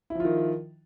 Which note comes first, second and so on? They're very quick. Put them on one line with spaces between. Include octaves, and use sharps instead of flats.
E4 F3 F4 D#3